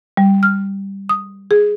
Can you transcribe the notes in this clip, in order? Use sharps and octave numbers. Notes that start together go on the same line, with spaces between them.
G3
F6
D#6
G#4